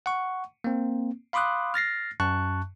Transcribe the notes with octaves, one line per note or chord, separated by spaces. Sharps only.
F#5 C#6
A#3 C4
F5 B5 C6 D6 D#6 F#6
F6 A6 A#6 C7
F#2 A5 C#6 F#6